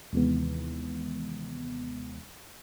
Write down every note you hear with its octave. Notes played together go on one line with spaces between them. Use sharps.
D#2 C3 D#3 E3 G#3 B3